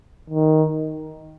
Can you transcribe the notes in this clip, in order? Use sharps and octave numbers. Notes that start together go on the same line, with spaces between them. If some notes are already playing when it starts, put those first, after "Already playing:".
D#3